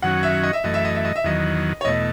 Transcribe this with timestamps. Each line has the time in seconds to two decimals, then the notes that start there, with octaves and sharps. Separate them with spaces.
0.02 F#2 D#3 F#3 C#4 F#4 F#5
0.23 E5
0.43 D#5
0.53 E5
0.64 F#2 E3 A3 D#5
0.74 E5
0.85 D#5
0.95 E5
1.05 D#5
1.16 E5
1.24 E2 D#3 F#3 D#5
1.81 C#5
1.85 E2 B2 A3 D#5